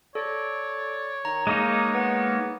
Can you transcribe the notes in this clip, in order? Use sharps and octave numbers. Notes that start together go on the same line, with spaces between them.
A4 C#5 D5
D#3 A#5
G#3 A#3 D#4 D#5
B3